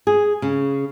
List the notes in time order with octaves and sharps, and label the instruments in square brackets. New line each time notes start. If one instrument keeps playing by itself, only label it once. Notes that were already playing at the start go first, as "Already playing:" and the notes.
[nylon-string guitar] G#4
C#3